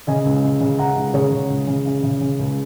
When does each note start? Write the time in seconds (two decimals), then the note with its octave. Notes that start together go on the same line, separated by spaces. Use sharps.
0.07 C#3 D#5 G#5
0.25 C#2
0.44 C#3
0.61 C#3
0.78 C#3 F#5 A#5
0.96 C#2
1.14 C#3 G#4 C#5
1.31 C#3
1.50 C#2
1.67 C#3
1.86 C#3
2.03 C#3
2.21 C#3
2.39 C#2